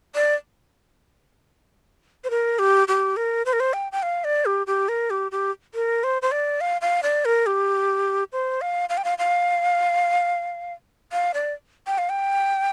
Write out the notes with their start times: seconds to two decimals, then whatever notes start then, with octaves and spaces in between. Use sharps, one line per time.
0.15 D5
2.24 C5
2.30 A#4
2.59 G4
2.88 G4
3.17 A#4
3.46 C5
3.53 A#4
3.60 C5
3.73 G5
3.92 G5
4.03 F5
4.24 D5
4.46 G4
4.67 G4
4.89 A#4
5.10 G4
5.32 G4
5.75 A#4
6.04 C5
6.22 C5
6.32 D5
6.61 F5
6.81 F5
7.03 D5
7.25 A#4
7.46 G4
8.33 C5
8.61 F5
8.89 F5
8.97 G5
9.05 F5
9.18 F5
11.12 F5
11.34 D5
11.87 G5
11.98 F5
12.09 G5